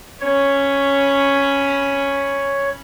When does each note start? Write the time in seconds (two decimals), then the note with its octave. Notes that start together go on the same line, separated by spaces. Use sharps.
0.21 C#4 C#5 B5